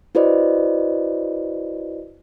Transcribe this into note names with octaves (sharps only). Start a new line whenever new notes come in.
E4 F#4 B4 C5 D5 D#5